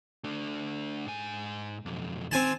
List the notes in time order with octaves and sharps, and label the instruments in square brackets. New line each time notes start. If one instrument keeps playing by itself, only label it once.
[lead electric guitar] A3 D4
G#2 G#5
B1 F2
[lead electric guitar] D#3 C5 [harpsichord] C4 G#5 A5